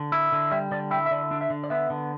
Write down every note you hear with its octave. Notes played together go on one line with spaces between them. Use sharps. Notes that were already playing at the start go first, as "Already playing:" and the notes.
Already playing: D3
E4
D3
G3 E5
D3 D5
E4 G5
E5
D3 D5
D4
E5
D3
D5
B3 E5
D3